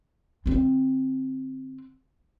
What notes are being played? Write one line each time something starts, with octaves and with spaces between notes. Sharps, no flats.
D3 C4